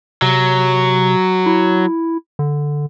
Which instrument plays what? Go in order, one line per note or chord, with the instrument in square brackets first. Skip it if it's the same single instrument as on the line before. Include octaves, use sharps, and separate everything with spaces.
[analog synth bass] C3 [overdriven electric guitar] F#3
[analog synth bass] E4
D3